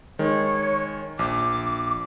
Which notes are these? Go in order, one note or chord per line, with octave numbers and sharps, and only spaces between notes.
D#3 G#3 C#5
A#1 D6